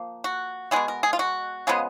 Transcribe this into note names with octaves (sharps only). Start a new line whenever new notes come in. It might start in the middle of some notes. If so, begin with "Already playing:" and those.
Already playing: F3 A#3
F#4
B2 G#3 B3 G#4
A#4
G#4
F4
F#4
C#3 F3 G#3 B3 G#4